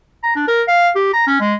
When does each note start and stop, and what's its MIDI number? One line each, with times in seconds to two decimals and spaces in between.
0.23 0.32 82
0.36 0.44 62
0.48 0.63 70
0.68 0.89 77
0.96 1.10 67
1.14 1.25 82
1.27 1.39 61
1.40 1.55 56